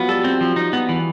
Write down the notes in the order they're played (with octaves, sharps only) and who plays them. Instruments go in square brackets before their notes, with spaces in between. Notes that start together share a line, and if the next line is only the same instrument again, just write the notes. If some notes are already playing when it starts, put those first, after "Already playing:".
Already playing: [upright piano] F3 F#3 F4 F#4 [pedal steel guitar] B3
[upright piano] G3 G4 [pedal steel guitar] A4
[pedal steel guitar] C4
F3
D#4
B3
E3